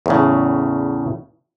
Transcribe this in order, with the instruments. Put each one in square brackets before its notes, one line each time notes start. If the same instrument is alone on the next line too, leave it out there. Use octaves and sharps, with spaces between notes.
[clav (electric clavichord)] E2 A2 C#3